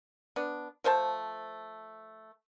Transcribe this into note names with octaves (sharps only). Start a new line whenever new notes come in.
B3 D4
F3 A3 C5 A5